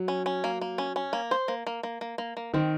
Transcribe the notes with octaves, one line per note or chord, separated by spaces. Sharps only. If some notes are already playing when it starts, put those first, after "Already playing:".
Already playing: F#3
C#4
C#4
A#3
A#3
C#4
C#4
A#3
C5
A#3
A#3
A#3
A#3
A#3
A#3
D#3 C4